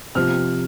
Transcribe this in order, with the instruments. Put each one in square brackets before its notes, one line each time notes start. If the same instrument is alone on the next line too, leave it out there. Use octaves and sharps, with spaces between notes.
[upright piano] C3 F3 F6